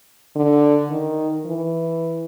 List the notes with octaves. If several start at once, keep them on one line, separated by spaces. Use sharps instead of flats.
D3
D#3
E3